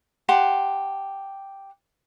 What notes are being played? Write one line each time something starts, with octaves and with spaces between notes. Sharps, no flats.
G4 F#5 A5 C6